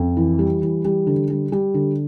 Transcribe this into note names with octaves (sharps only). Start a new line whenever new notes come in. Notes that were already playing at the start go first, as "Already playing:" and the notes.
Already playing: F2
E3
G3
E3
G3
D3
G3
G3
D3